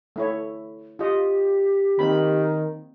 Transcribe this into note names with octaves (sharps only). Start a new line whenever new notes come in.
A3 E4 C#5
F4 G4 D#5
D#3 A#3 C4 B5